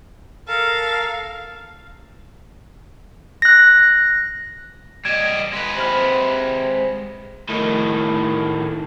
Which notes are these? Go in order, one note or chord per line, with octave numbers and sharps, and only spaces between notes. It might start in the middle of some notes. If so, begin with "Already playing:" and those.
A4 A#4 F5 A5
F#6 A#6
G3 D#5 G#6 D7 E7
G#3 B4
C3 B5 F6
A2 D#3